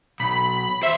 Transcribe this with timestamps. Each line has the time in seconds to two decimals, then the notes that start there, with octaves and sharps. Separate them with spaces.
0.20 B1 B5
0.83 E2 C5 E5